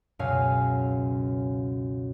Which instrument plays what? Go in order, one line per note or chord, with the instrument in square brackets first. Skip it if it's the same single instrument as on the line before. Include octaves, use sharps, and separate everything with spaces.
[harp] C#2 F#2 B2 C#5 F5 G#5